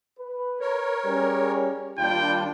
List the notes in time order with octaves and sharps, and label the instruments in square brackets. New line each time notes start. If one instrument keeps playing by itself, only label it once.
[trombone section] B4
[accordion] A#4 C#5
[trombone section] G3 C#4 G#4
[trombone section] D#2 [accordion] G3 D4 F4 [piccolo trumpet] G5